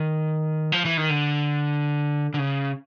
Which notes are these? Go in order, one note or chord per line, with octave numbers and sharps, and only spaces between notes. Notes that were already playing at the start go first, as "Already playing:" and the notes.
Already playing: D#3
F3
E3
D#3
D3
D3
C#3